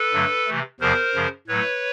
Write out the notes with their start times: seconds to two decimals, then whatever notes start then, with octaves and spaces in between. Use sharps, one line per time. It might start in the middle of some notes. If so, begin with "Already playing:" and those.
Already playing: A4 B4
0.13 G2 D3 F#3 A3
0.47 C3 E3 A3
0.80 E2 C3 F3 A#4 C5
1.14 F#2 C#3 F3
1.48 A2 F#3 A3 B4 C#5